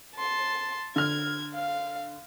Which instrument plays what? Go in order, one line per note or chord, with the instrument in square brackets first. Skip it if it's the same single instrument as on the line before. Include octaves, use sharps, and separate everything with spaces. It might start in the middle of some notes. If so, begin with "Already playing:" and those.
[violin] A5 C6
[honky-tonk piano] D3 F6 [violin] G#6
[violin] F5